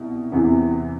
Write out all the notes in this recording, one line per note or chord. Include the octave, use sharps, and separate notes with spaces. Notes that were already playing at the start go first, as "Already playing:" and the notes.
Already playing: C2 B2
E2 C3 E3 B3